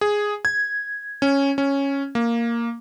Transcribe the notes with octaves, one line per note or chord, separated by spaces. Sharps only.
G#4
G#6
C#4
C#4
A#3